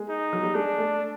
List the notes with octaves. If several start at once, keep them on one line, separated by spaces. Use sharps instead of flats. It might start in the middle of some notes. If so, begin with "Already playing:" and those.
Already playing: G#3
D#4
F#3
G3
G#3 D4
A3